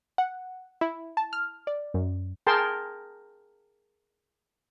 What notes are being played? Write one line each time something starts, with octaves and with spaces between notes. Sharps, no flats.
F#5
E4
A5
F6
D5
F#2
G#4 A#4 G5 A5 C6